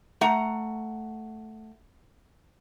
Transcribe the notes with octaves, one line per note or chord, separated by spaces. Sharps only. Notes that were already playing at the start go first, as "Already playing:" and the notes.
A3 F#5 A#5